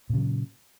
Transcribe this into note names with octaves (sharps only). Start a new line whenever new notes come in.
A#2 C#3 F#3